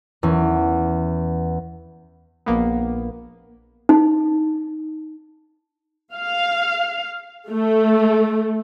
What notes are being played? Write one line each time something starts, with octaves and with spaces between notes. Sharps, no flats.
E2 C#4
A#1 A#3 B3
D#4
F5
A3